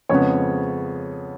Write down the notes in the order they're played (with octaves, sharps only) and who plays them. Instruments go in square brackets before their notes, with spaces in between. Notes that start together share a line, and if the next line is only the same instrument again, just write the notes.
[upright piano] F2 C#3 G#3 B3 C#5